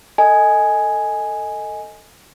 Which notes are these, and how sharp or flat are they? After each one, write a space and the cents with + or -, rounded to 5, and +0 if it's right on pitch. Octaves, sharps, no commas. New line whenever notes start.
A4 +20 D#5 +10 G#5 +0